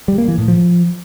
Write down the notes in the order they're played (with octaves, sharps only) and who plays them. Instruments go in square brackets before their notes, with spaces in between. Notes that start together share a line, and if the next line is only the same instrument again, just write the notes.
[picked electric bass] G3
A#3
E3
A2
F3